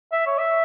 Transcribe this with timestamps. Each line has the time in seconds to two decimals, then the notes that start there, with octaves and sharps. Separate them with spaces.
0.12 E5
0.27 C#5
0.39 E5